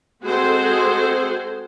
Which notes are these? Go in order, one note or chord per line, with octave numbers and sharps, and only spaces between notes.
G#3 C4 F#4 G#4 A4 C5